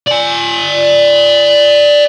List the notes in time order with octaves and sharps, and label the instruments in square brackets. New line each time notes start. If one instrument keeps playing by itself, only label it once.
[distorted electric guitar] D5 G#5